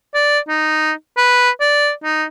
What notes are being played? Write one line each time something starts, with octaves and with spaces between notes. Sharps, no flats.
D5
D#4
B4
D5
D#4